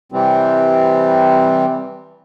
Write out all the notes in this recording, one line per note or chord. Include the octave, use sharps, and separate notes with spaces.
C3 E3 G3 C4